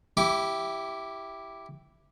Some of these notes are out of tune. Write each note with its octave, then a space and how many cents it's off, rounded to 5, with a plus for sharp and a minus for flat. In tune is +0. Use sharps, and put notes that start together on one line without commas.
E4 +0 G4 +0 D6 -30